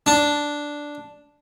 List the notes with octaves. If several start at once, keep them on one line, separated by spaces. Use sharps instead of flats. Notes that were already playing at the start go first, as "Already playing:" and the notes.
D4